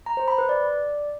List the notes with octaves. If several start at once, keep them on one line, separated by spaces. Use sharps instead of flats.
A#5
C5
B5
B4
D5